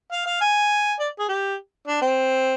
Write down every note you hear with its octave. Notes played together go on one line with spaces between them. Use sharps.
F5
F5
G#5
D5
G#4
G4
D4
C4